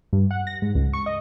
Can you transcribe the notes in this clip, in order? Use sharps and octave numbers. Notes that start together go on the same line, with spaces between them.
G2
F#5
A#6
G#2
C#2
C#6
D#5